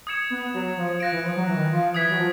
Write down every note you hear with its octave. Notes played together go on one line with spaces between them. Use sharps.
D#6 G#6 C#7 E7
B3
F#3
F3
F3 F#6 A#6 D7
E3
F3
F#3
E3
D#3
E3
F3
E3 D#6 G#6 B6
F#3
F3